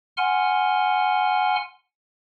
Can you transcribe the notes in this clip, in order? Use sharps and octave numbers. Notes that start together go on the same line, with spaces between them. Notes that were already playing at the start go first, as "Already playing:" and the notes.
F#5 G#5 C6 F6